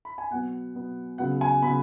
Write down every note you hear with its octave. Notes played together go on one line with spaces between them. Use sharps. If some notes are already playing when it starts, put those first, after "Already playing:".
B5
G#5
B2 F#3 B3 F#5
B2 F#3 B3
C#3 F#3 B3 F#5
G#5
C#3 F#3 B3 B5